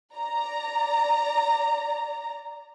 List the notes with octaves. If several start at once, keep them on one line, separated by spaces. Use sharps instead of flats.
D5 A#5